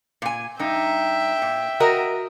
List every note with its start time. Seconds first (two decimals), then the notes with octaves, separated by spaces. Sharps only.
0.22 A#2 G#5
0.59 G2 D#4 E5 G5
1.42 A#2
1.80 F#4 A#4 D#5